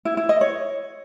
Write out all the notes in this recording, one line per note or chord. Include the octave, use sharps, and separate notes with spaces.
E4
E4
D#5
C#5